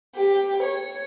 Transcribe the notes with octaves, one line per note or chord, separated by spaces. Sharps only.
G4
C#5